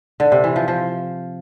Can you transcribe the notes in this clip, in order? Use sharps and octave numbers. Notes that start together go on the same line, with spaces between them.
D3
C3
E3
F3
F3